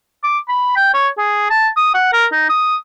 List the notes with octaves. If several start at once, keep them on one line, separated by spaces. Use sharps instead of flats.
D6
B5
G5
C#5
G#4
A5
D#6
F#5
A#4
D#4
D#6